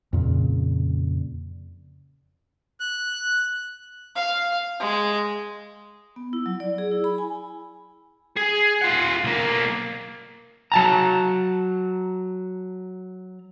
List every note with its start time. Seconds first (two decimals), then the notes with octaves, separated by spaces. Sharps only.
0.13 F2 A#2 C#3
2.80 F#6
4.16 F5
4.80 G#3
6.16 B3
6.33 E4
6.46 F#3
6.60 D5
6.78 G#4
6.91 E4
7.04 B5
7.18 G#5
8.37 G#4
8.81 F4 F#5
9.24 B1 A#3
10.72 F#3 A5 A#5